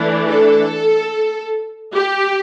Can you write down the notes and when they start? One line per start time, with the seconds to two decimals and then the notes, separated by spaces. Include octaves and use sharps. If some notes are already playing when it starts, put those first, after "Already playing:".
Already playing: E3 A3 D4
0.26 A4
1.95 G4